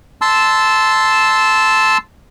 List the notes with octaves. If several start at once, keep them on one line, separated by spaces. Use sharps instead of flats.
A5 C6 E6